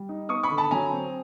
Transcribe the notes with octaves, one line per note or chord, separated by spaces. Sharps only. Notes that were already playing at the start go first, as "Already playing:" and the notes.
Already playing: G3
D#4
B3 C#6 D#6
B5 C#6
D3
A5 B5
F#3 G#5 A#5
C4